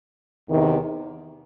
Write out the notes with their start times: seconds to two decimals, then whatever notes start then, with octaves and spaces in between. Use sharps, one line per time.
0.48 E2 C3 D#3